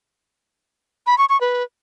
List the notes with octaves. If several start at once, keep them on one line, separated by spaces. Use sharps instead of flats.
B5
C#6
C#6
B4